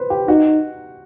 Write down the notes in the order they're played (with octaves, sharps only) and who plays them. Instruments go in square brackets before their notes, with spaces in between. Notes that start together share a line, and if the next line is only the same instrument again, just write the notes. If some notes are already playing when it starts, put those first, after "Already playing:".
Already playing: [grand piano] B4 C5
G4
[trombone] D#4 [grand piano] F#4